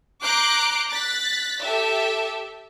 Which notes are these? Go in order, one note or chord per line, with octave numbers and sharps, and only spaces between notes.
A#5 D6 F#6 G6 C7 D7
F#6 A6 B6
G4 A4 E5